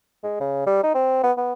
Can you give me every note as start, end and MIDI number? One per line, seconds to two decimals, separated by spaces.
0.24 0.40 56
0.41 0.63 49
0.67 0.83 55
0.84 0.93 63
0.95 1.20 60
1.24 1.32 59
1.37 1.53 59